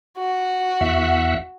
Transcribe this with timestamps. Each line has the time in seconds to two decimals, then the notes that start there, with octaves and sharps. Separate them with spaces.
0.17 F#4
0.81 E2 E5 F#5